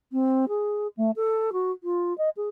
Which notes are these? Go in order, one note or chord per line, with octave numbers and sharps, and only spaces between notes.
C4
G#4
A3
A4
F#4
F4
D#5
G#4